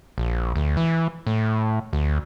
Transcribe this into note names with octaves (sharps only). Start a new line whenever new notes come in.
A#1
D2
E3
A2
D2